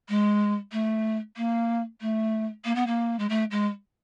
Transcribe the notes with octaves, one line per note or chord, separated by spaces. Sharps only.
G#3
A3
A#3
A3
A#3
B3
A#3
G#3
A3
G#3